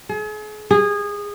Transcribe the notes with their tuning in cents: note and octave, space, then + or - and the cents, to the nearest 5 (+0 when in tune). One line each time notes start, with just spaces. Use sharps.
G#4 +40
G#4 -20